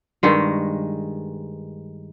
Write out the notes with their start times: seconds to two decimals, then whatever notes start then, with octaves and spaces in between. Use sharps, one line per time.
0.23 G2 D#3 G#3